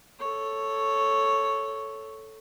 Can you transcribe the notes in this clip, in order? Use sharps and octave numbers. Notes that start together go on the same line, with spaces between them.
A4 C#5